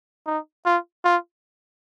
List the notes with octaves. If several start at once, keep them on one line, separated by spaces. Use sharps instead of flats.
D#4
F4
F4